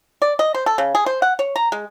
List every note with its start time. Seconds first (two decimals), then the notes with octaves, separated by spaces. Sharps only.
0.22 D5
0.39 D#5
0.54 C5
0.66 A4
0.78 C#3
0.95 G#4
1.06 C5
1.22 F#5
1.39 C#5
1.56 A#5
1.72 G#3